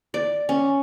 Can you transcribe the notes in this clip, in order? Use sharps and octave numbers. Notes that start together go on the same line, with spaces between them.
D5
C#4